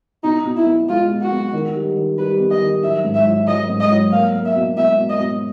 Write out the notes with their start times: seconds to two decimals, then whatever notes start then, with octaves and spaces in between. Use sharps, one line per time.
0.23 B2 D#4
0.45 B2
0.56 E4
0.66 B3
0.89 G#3 F4
1.10 B2
1.22 F#4
1.31 B3
1.53 D#3
1.75 G3
1.96 D#3
2.18 G3 B4
2.40 B3
2.51 D#5
2.61 D#3
2.83 F#3 E5
3.04 G#2
3.15 E5
3.26 F#3
3.47 F#3 D#5
3.69 G#2
3.80 D#5
3.91 F#3
4.12 A#3 F5
4.34 A#3
4.45 E5
4.56 B2
4.77 B2 E5
4.99 B2
5.09 D#5
5.20 B2